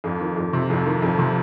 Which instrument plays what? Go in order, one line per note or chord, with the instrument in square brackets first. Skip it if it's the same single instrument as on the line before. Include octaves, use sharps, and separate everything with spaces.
[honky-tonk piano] F2
D#3
F2
C3
F2
D#3
F2
C3